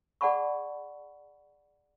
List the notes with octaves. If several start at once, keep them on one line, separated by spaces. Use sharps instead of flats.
G#4 D5 F#5 A5 B5 C#6